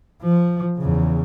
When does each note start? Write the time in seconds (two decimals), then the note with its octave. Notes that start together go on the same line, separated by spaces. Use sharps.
0.23 F3
0.77 E2 C#3